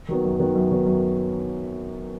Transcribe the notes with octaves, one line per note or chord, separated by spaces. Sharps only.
D#3 F#3 B3
F#2
D#3 F#3 B3
F#2
D#3 F#3 B3
F#2